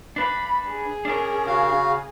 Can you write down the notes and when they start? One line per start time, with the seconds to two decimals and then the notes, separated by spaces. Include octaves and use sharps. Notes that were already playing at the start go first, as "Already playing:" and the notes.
0.16 D4 B4 B5
0.70 G#4
1.05 C#4 D4 A#4
1.46 C#3 F#4 F5